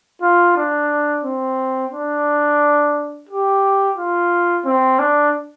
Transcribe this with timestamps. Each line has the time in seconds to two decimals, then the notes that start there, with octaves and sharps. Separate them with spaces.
0.22 F4
0.57 D4
1.25 C4
1.93 D4
3.29 G4
3.97 F4
4.65 C4
4.99 D4